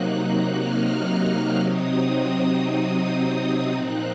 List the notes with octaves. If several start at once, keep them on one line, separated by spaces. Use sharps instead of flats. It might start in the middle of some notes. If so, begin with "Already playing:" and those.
Already playing: C3 F#3 A#3 D#4 F#6
F6
C3 F#3 C4 D#4 D#6
A#2 F3 C4 D#4 F#6